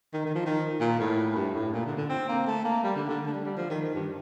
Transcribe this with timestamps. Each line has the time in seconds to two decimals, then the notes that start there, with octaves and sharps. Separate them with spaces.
0.14 D#3
0.25 D#3
0.35 F3
0.46 D#3
0.80 A#2
1.00 A2
1.36 G2
1.55 A2
1.73 A#2
1.86 D3
1.97 D3
2.10 C4
2.29 A#3
2.47 A3
2.65 A#3
2.83 G3
2.96 D3
3.09 D3
3.26 A3
3.33 G3
3.45 G3
3.57 F3
3.70 D#3
3.82 D#3
3.95 G2